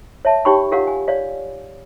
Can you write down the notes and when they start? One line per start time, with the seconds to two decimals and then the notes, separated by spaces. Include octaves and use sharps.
0.25 C#5 E5 A5
0.45 D#4 G4 C#5 G5 B5 C#6
0.71 F4 G4 A#4 C#5 F5 F#5
0.87 G#5
1.08 C#5 D5 F5